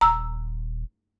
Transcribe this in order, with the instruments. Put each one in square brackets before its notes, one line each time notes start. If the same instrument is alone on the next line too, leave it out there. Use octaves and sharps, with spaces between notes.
[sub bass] D#1 [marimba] A#5 E6